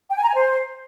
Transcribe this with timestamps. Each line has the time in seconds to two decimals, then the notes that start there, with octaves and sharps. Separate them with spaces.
0.11 G5
0.17 G#5
0.23 A#5
0.29 G#5
0.35 C5